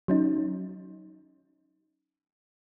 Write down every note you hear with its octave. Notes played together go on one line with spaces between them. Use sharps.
F#3 C#4 D#4